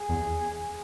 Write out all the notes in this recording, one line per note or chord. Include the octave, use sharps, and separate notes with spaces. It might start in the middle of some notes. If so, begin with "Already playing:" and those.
Already playing: G#4
E2